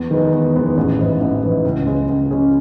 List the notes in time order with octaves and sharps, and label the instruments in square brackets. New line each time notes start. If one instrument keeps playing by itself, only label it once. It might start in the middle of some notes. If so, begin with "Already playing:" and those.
Already playing: [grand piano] E2
D#3 G#3 B3
E2
D#3 G#3 B3
A1
G#2 E3 B3
A1
G#2 E3 B3
C#2
C#3 G#3 C#4 G#4
C#2
C#3 G#3 C#4 G#4